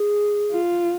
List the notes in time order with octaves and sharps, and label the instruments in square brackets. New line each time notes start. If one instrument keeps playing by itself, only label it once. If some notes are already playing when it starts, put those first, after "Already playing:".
Already playing: [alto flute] G#4
[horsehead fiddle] F4